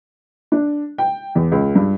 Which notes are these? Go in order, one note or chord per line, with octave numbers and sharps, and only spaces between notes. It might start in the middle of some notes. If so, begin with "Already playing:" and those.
D4
G5
E2
C#2
G2